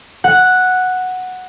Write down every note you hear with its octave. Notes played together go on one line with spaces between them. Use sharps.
F#5